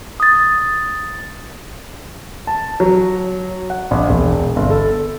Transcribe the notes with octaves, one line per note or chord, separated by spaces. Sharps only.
D#6 A6
A5
F#3
F#5
A#1
E1
G1
A4